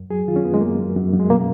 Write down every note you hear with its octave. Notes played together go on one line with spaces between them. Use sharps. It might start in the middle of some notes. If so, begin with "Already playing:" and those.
Already playing: F#2
F#3 G#4
D#3 F4
C#4
F#2 B3
G#3
F#2 A#3
F#2
F#2
F#2
G#3
B2 A#3